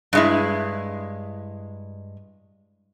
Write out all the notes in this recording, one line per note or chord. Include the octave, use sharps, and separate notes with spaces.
G2 G#3 E4